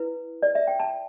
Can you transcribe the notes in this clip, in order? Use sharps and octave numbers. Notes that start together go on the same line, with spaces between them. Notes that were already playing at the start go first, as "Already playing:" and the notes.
Already playing: E4 B4
D5
E5
G5
A5